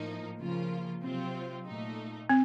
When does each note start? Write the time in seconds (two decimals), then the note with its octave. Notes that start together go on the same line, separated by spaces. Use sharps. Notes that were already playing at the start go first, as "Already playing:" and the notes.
Already playing: A2 F3 A#3 D#4
0.39 C#3 F3 A#3 F4
1.02 C3 F#3 C4 F4
1.66 A#2 A3 D#4
2.29 C4